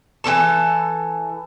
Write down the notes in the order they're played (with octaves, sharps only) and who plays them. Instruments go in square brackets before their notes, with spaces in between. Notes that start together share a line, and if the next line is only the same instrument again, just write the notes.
[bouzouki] E3 E4 A4 A5